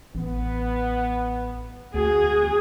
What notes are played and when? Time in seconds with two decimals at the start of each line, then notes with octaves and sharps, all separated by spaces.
0.15 A1 B3
1.94 D2 F#4 G#4